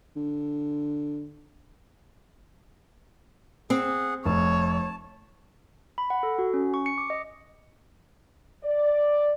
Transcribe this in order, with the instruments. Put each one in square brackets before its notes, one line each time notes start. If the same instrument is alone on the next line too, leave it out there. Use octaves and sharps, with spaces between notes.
[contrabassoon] D3
[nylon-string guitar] C4 [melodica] G#4 F#5
[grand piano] F1 [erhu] C#5 [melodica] A5
[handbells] B5
F#5
A4
F#4
C#4
C#6
C#7
D6
D#5
[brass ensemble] D5